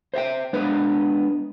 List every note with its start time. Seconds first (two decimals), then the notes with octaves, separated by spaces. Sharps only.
0.14 C5 E5 F5 G5
0.53 G#3 B3 D4 B4